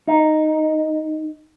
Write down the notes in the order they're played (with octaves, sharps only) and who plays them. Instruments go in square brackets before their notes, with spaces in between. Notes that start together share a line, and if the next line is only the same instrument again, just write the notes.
[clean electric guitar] D#4